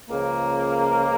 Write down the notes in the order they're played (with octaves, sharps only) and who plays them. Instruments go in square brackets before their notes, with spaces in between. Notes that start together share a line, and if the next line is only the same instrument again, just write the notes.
[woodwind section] C#2 C#3 F3 A#3